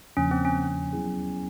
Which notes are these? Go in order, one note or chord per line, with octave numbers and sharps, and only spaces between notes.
E2 C#3 F3 A#3 C#4 D4
C4
C#4
F#3 B3 E4 G#4